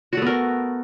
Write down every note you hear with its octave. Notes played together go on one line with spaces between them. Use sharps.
A3 B3 F#4 A#4